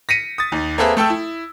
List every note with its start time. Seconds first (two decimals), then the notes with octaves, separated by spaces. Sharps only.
0.09 A#6 B6 C#7 D#7
0.38 D#6 A6
0.52 D#2
0.78 A#3 C4 G#4 A4 B4 E5
0.97 A3 A4 G5 E6
1.10 E4